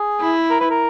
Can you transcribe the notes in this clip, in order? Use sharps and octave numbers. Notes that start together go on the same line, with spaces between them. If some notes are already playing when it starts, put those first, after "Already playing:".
Already playing: G#4
E4
A#4
B4
A#4